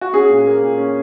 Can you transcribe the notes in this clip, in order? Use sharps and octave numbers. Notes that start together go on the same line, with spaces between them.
F#4
C#4 G#4
A#2
A#3
A#2
C#4